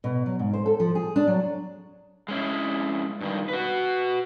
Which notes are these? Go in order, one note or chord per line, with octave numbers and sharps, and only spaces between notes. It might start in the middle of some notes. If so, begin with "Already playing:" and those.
B2
F#3
G#2
C5
A4
F3
G#4
D4
F#3
G#3 C#4 E4
G2 D#3
F#4 B4